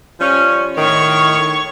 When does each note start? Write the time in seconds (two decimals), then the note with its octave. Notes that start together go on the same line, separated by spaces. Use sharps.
0.20 F3 G3 C#4
0.77 A2 D#3 C#5 C#6